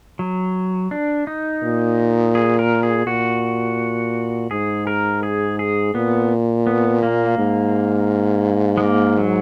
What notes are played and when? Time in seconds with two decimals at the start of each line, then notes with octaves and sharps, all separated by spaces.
0.19 F#3
0.91 D4
1.27 D#4
1.63 A#2
2.35 G#4
2.59 A#4
2.83 G#4
3.07 A#2 F#4
4.51 G#2 G#4
4.87 A#4
5.23 G#4
5.59 G#4
5.95 A#2 B3
6.67 B3
7.03 A#3
7.38 G#2
8.78 G#3
8.83 A#3
9.18 F#3